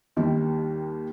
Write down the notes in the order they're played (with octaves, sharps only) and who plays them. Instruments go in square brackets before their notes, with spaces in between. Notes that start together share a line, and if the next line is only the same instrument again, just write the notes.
[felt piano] D#2 D#3 G3